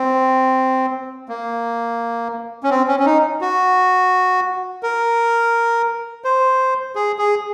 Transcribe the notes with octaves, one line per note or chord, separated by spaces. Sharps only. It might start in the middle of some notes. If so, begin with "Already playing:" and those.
Already playing: C4
A#3
C#4
C4
C#4
C#4
D#4
F#4
A#4
C5
G#4
G#4